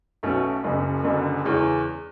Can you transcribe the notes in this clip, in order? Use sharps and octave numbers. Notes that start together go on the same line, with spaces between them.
B1 B2 A3 C#4
F#1 F#2 C#3
F#1 F#2 D3
E2 C#3 G#3 C#4